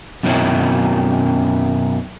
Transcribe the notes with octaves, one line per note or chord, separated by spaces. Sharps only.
F#2 B2 D#3 C4 C#4 E4